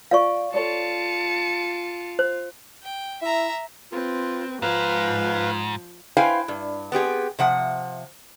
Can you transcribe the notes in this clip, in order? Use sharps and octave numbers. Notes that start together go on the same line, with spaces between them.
F4 C5 D5 F5 C#6
F4 A4 C#5 D5 A5 C#7
C5
G5
E4 E5 A#5
C4 F4 B4
G#2 F3 B4 F5
E4 B4 C5 F5 G5 G#5
G2
B3 C4 G4 G#4
C3 F3 F#5